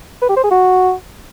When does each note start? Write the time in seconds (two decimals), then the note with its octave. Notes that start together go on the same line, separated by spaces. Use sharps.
0.22 B4
0.29 G4
0.36 C5
0.44 G#4
0.51 F#4